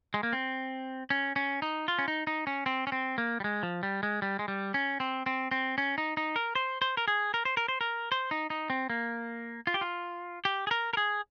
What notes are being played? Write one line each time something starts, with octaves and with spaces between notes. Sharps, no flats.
G#3
A#3
C4
C#4
C#4
D#4
F4
C#4
D#4
D#4
C#4
C4
C#4
C4
A#3
G3
G#3
F3
G3
G#3
G3
G#3
G3
C#4
C4
C4
C4
C#4
D#4
D#4
A#4
C5
C5
A#4
G#4
A#4
C5
A#4
C5
A#4
C5
D#4
D#4
C4
A#3
F4
G4
F4
G4
G#4
A#4
A#4
G#4